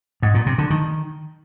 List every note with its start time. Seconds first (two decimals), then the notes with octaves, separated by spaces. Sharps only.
0.22 G#2
0.34 A#2
0.46 C3
0.58 D3
0.70 D#3